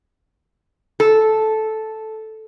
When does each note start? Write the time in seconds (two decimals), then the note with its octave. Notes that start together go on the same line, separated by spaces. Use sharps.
1.00 A4